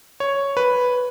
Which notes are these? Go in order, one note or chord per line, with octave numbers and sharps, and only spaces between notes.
C#5
B4